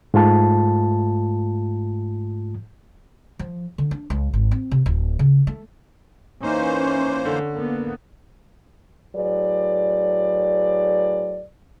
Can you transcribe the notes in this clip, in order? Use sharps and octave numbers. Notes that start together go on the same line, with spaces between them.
G#2 A3 F4 A5
F3
D3
D4
C#2
G#1
C4
C3
D1
C#3
A3
E3 A#3 C#4 D#4 C5
D3
A#3 B3
A2 F#3 G#4 B4 D5